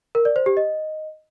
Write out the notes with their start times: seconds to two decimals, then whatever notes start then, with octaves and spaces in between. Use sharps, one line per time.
0.15 A#4
0.25 D5
0.36 C5
0.46 G4
0.57 D#5